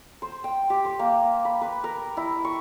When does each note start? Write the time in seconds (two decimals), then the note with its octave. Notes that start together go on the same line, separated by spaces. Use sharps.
0.22 C5
0.44 G5
0.70 G4
0.85 C5
0.99 A#3
1.45 B5
1.61 B4
1.84 A#4
2.17 E4
2.45 C#6